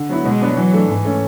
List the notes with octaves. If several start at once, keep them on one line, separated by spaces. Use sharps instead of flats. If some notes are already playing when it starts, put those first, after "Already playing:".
Already playing: D3
F#3 B3 E4
B2 G#3
F#3 B3 D4
E3 F#3
A3 D4
G#2 E3
A3 C#4